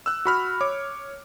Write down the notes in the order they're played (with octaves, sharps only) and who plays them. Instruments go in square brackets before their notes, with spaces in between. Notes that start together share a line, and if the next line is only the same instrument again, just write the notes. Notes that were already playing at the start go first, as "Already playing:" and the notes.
[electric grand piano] E6 F#6
F#4 B5 F6
C#5 D6